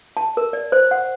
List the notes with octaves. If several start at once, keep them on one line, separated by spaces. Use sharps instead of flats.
A5
A#4
D5
C5
F#5